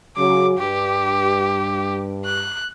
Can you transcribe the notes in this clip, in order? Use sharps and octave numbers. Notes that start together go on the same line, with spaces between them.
C#3 F#3 D6
G2 G4
F#6